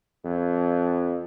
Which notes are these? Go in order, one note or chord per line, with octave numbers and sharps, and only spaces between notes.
F2